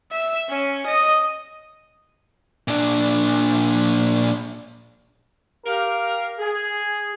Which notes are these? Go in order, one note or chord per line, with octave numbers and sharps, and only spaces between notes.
E5
C#4
D#5
A#2 D4
G4 A#4 F5
G#4